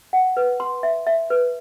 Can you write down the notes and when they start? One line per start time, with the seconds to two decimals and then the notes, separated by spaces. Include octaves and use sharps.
0.13 F#5
0.37 B4
0.60 C6
0.83 E5
1.07 E5
1.30 B4